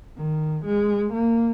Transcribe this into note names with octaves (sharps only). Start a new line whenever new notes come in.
D#3
G#3
A#3